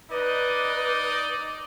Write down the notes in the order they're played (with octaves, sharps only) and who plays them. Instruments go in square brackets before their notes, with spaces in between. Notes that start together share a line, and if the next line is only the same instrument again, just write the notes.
[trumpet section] D#4 D5 D#5 [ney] B4